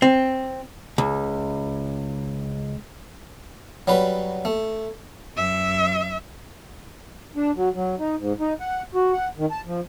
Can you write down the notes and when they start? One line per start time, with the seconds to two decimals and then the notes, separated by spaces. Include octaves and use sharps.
0.02 C4
0.98 C#2
3.88 F#3 G3 B4
4.45 A3
5.36 F#2 E5
7.36 D4
7.56 F#3
7.75 F#3
7.99 D#4
8.19 G#2
8.40 D#4
8.60 F#5
8.95 F#4
9.13 F#5
9.38 D#3
9.51 A5
9.66 F3